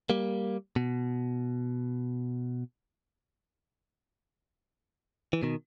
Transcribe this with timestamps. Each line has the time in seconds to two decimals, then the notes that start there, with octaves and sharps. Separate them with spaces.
0.10 G3 A#3
0.76 B2
5.33 E3
5.43 B2 D#3